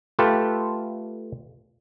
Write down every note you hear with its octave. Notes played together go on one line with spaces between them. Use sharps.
A3 F4 G4 A4 B4